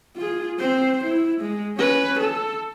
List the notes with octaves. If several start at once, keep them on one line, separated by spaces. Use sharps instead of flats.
F4 G#4
C4 C5
E4
G#3
C#4 B4
A4